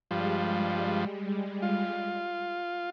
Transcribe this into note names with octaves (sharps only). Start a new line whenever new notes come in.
G2 F3 G3 G#3
F4